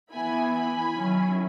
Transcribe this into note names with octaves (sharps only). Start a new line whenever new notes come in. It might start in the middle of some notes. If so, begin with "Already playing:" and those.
E3 B3 E4 G#5 B5
G#5 B5
D#3 F#3 C#4 E4